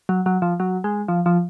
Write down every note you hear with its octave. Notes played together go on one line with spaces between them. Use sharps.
F#3
F#3
F3
F#3
G#3
F3
F3